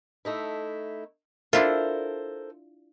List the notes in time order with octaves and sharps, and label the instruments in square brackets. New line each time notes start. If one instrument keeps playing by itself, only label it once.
[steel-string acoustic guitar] A3 D#4 E4
[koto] D4 E4 F4 [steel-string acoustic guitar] A4 A#4 C5